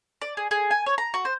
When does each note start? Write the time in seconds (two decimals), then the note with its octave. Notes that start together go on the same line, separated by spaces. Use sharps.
0.22 D5
0.37 G#4
0.51 G#4
0.71 G#5
0.86 C#5
0.98 A#5
1.14 F#4
1.25 C5